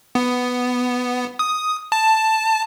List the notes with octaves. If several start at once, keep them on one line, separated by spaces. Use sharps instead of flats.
B3
D#6
A5